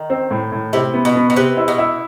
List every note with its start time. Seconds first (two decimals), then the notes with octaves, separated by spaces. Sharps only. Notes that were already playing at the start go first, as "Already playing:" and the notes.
Already playing: D#3
0.10 C4
0.30 A2
0.52 A2
0.73 C3 E4
0.94 B3
1.05 B2
1.15 B3
1.30 B2
1.36 C3 B4
1.57 E4
1.68 B2
1.78 E4